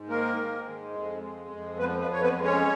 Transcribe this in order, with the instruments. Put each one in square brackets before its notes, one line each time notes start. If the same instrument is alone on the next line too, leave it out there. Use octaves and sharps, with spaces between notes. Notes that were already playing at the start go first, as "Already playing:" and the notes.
Already playing: [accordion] G#2
D#3 A#3 A#4
G#2
G#3
F2
G#3
F2
F3 B3 B4
B3 B4
F2 C#5
B3 B4
G#3
C#4 C#5